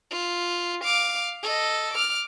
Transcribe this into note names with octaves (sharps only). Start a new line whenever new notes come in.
F4
F5 D6
A4 D#5
D6 F6